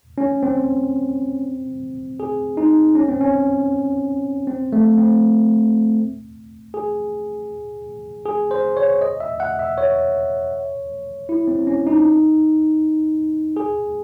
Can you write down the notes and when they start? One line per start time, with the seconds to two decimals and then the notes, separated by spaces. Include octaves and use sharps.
0.18 C#4
0.43 C4
2.20 G#4
2.57 D#4
2.95 C#4
3.08 C4
3.21 C#4
4.47 C4
4.73 A3
4.98 C4
6.74 G#4
8.26 G#4
8.51 C5
8.77 C#5
9.01 D#5
9.20 E5
9.40 F#5
9.59 E5
9.78 C#5
11.29 E4
11.48 C4
11.67 C#4
11.87 D#4
13.57 G#4